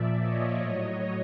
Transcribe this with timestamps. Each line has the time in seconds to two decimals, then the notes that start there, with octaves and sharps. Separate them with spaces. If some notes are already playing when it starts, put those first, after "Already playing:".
Already playing: A#2 F3 D5 E5
0.19 C#5 D#5
0.59 A2 F#3